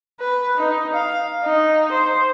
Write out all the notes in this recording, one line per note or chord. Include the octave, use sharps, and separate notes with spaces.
B4
D#4
F5
D#4
C5